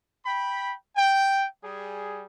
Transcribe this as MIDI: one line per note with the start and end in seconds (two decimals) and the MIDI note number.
0.25 0.73 79
0.25 0.73 83
0.96 1.45 79
1.63 2.25 55
1.63 2.25 68